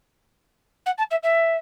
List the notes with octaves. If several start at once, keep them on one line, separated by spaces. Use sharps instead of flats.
F#5
A5
E5
E5